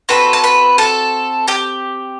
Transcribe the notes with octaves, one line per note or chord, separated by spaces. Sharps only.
C4 F#4 A4 B4 B5
A5
B4 B5
A4 A5
G4 G5